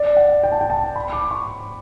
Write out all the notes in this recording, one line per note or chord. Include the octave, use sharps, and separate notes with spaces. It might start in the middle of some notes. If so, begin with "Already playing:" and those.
Already playing: D5
F#5
G5
A5
G5
A5
B5
D6
C#6